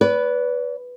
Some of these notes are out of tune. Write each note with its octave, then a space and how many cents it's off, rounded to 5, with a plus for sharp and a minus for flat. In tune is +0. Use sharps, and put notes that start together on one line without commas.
B4 +0 D5 -40